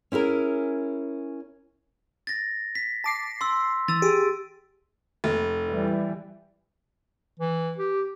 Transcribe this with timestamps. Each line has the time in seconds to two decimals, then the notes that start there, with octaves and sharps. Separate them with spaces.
0.12 C#4 E4 G#4 A#4
2.27 A6 A#6
2.75 B6
3.04 A5 D6 C7
3.41 C6 E6
3.88 E3 E6 A6
4.02 G4 G#4
5.24 F1
5.68 E3 G3
7.39 E3
7.78 G4